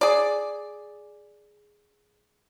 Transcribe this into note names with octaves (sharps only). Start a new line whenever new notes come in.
G#4 D5